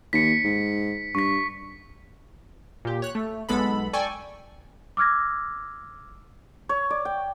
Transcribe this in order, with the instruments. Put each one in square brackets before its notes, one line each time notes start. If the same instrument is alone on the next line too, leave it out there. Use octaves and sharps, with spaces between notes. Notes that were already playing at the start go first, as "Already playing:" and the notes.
[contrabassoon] D#2 [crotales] B6 C#7
[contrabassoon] G#2
[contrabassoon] G2 [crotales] C#6 B6
[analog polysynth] A#2 G4
C#5 F#6
A3
B1 G#3 B3 A4 B5
A4 D5 G5 G#5 C#6
[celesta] D6 E6 F6 G#6 A#6
[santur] C#5
D5
G5